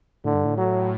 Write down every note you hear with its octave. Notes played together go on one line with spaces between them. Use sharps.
A2 D3
G2
A2
F#3